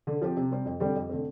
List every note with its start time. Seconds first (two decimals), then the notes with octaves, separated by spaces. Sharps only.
0.07 D3
0.21 F3 C4 G4
0.37 C3
0.51 G3 C4
0.65 F2
0.80 D3 G3 C4 G4
0.96 F2
1.09 D3 A3 C4